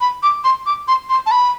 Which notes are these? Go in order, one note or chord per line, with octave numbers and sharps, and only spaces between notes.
B5
D6
C6
D6
C6
C6
A5
B5